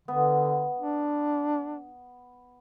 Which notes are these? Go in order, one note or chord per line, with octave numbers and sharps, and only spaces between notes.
D3 B3
D4